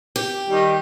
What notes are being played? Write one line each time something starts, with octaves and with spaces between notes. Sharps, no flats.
G4
D#3 G3 D#4